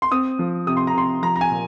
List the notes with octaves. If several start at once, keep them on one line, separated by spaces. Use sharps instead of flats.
C6
C4 D#6
F3
C3 D#6
C6
A#5
C3 C6
F3 A#5
A#5
G#5
A#2